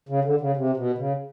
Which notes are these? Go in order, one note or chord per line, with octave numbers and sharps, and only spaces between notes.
C#3
D3
C#3
C3
B2
C#3